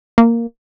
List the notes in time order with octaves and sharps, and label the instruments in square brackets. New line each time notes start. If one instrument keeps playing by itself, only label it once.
[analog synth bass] A#3